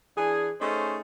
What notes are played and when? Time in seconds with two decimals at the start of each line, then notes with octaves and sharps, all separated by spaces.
0.16 E3 D4 G#4
0.60 A3 C#4 D#4 G#4 C5